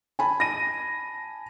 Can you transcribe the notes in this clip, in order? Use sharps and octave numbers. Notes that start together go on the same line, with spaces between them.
G#5 A5 B5
A#6 D#7